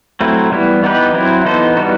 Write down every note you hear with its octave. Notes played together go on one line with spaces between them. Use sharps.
F#3 A3 C4 E4
E3 G3 B3 E4
E3 B3 D#4 G4 B4
F#3 C4 E4
E3 B3 D#4 A4 C5
E3 G3 B3 D#4 F#4